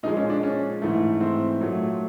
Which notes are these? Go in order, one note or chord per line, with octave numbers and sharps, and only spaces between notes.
A#2 F3 G#3 D#4
C#4
D4
C#4
G#2 E3 A3
C4
A#2 F#3 A3